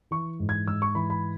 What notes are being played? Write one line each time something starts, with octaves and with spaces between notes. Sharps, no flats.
E3 C#6
G#2
G#6
G#2 E6
C#6
E3 B5
B5